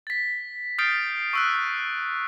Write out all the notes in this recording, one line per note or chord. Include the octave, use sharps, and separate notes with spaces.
A6 B6
D#6 F6 G6 A6 C7 D7
C#6 E6 F#6